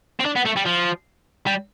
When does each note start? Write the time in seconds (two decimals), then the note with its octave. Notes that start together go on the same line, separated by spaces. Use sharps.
0.20 C4
0.25 D4
0.36 B3
0.45 A3
0.56 G3
0.66 F3
1.47 G3